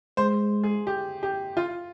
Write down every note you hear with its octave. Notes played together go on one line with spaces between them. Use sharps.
G#3 C5
G#4
G4
G4
F4